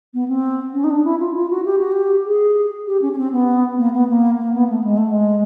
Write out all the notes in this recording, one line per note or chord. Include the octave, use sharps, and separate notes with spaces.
B3
C4
C#4
D#4
D4
E4
F4
F4
F#4
G4
F#4
G4
G#4
G4
C#4
C#4
C4
B3
A#3
B3
A#3
A#3
B3
A3
G#3
A3
G#3